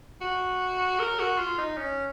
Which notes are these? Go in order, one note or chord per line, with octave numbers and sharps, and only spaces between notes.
F#4
A#4
F#4
F4
D#4
C#4